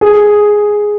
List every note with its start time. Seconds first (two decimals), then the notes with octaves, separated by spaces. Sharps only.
0.01 G#4